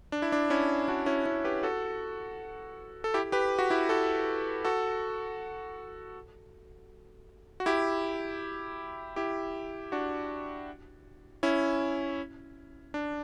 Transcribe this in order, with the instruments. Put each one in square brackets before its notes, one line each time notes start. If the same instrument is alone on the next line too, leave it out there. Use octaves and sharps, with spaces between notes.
[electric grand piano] D4
E4
D4
C#4 E4
D4 F#4
C#4 E4
C#4 E4
G4 B4
F#4 A4
A4
E4 G4
G4 B4
F#4
E4 G4
F#4 A4
F#4 A4
F#4
E4 G4
E4 G4
D4 F#4
C#4 E4
D4